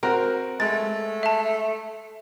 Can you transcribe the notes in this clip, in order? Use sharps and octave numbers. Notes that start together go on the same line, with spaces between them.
C4 F#4 A#4
G#3 A3 A6
E5 A5